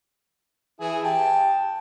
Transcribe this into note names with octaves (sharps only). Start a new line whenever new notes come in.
E3 E4 G#4
G4 G5 A5